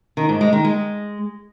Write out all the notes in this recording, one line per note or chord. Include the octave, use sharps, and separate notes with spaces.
D#3
G#2
G#3
D#3
G#3